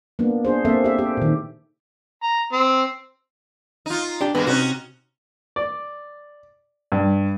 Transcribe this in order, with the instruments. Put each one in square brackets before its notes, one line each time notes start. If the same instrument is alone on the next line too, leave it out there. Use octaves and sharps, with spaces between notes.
[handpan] A#3 B3 D4
D4 G#4 C5
A#3 C4 A4 E5
G4 E5
G4 A4
A#2 D#3
[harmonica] A#5
C4
[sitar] D#4 F4
[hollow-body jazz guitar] D4 G4
[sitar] G2 G#3 A#3 [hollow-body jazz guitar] B3
[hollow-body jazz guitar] C3 [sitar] C#4 D#4 F#4
[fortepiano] D5
G2